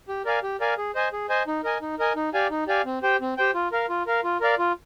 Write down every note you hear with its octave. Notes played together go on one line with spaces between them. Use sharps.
G4
A#4 D5 F5 G#5
G4
A#4 D5 F5 G#5
G#4
C5 D#5 G#5
G#4
C5 D#5 G#5
D#4
A#4 D#5 G#5
D#4
A#4 D#5 G#5
D#4
G4 D5 F5 G#5
D#4
G4 D5 F5 G#5
C4
G4 C5 G5
C4
G4 C5 G5
F4
A#4 F5
F4
A#4 F5
F4
A#4 D5 F5
F4